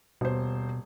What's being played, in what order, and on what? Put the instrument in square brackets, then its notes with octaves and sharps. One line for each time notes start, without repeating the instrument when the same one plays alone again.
[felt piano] D#1 C5 [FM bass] B2